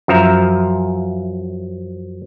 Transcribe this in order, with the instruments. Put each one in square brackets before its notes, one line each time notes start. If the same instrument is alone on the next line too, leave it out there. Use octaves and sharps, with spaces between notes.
[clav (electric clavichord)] F#2 F3 E5 A#5